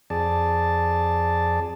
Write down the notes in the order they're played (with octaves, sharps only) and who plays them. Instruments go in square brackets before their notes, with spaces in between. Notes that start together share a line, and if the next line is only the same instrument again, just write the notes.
[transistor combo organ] F2 G#4 D5 A5